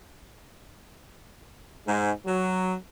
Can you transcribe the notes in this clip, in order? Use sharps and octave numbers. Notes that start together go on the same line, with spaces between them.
G#2
F#3